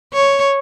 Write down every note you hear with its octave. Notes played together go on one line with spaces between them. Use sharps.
C#5